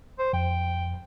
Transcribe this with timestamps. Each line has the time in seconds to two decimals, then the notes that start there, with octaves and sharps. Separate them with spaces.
0.19 C5
0.33 F2 G5